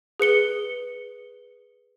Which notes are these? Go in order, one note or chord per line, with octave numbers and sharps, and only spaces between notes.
G#4 B4 C#7 G7